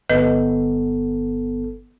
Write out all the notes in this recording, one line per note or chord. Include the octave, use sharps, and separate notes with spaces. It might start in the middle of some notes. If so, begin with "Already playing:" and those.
G1 B3 A4 B4 D#5